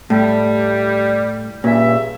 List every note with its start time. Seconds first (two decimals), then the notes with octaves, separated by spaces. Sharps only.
0.10 A2 G3
1.64 G2 A#2 C#3 E5